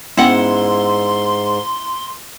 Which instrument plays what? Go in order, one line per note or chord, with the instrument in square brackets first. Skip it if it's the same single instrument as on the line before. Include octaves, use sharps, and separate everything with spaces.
[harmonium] G#2 [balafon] B3 C#4 G5 [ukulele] E4 F#5 [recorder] C6